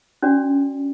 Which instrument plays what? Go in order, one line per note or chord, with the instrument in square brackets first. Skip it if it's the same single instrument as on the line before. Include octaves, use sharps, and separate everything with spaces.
[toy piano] C#4 D4 F#4 D5